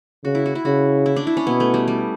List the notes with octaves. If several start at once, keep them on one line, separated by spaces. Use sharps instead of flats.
C#3 F#4
E4
F#4
E4
C#3 F#4
E4
D4
E4
C#4
B2 B3
A3
G3
G3